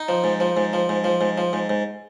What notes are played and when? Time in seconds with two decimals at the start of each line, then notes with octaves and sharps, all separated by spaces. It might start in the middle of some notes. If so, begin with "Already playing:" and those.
Already playing: D#4
0.09 F3
0.24 G#2
0.40 F3
0.57 G#2
0.73 F3
0.89 G#2
1.04 F3
1.21 G#2
1.38 F3
1.53 G#2
1.69 G#2